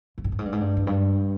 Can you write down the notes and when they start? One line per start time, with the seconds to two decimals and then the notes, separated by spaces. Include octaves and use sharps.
0.18 G2
0.24 G#2
0.32 G2
0.39 G#2
0.45 G2
0.52 G#2
0.61 G2
0.77 E2
0.87 G2